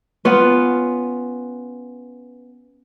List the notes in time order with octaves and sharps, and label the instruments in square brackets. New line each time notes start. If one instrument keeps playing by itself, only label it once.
[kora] B3 C#4 F4 B4